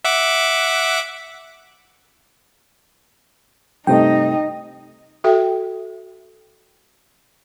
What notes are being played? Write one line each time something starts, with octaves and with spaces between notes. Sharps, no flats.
E5 F#5 D6
G2 C3 A3 D#4 D#5 G5
F#4 A4 E5 G5